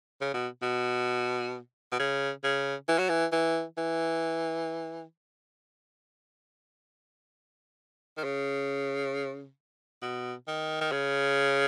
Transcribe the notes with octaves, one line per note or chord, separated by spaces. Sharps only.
C#3
B2
B2
B2
C#3
C#3
E3
F#3
E3
E3
E3
D#3
C#3
B2
D#3
D#3
C#3